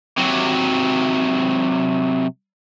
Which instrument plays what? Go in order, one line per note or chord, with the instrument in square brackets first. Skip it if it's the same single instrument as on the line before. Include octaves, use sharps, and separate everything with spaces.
[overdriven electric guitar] C3 F#3